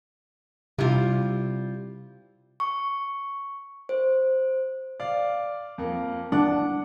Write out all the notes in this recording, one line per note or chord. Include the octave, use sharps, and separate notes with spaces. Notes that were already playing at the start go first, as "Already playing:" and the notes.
C3 G3 E4 F4
C#6
C5
D5 F5
F2 A#3
D4 F#5